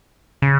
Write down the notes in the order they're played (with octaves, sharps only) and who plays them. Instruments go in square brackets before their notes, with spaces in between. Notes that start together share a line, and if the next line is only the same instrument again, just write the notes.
[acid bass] C#3